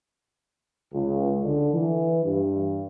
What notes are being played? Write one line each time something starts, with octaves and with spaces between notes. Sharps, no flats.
C#2
D3
E3
G2